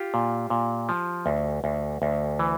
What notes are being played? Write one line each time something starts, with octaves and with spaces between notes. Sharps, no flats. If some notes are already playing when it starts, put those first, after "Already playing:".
Already playing: F4 G4
A#2
A#2
F3
D2
D2
D2
E3